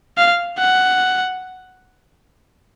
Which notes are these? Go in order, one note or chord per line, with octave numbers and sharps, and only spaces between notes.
F5
F#5